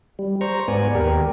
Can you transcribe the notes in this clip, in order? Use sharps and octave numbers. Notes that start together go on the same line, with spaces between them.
G3
C5 A#5 C#6
G#2 B3 D5 G#5
D#2 G4 A#4